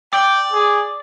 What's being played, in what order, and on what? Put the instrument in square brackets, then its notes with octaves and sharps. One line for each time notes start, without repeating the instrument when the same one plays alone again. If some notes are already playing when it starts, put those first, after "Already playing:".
[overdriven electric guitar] D5 [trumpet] G5
[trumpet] G#4